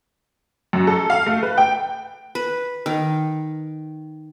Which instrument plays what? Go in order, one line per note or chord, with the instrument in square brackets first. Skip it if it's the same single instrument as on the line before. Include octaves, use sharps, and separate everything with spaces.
[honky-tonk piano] F#2
A4
F5
A3
B4
G5
[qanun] B4
D#3